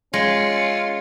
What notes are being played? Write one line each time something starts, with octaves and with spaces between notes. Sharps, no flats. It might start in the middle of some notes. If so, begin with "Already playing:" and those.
G#3 C#4 F4 C#7